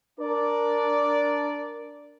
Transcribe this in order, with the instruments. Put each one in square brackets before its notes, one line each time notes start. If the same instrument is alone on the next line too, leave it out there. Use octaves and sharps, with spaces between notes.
[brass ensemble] D4 A#4 D5